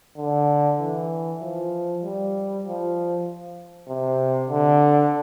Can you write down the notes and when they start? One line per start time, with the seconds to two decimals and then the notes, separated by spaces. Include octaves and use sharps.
0.17 D3
0.79 E3
1.41 F3
2.03 G3
2.64 F3
3.88 C3
4.50 D3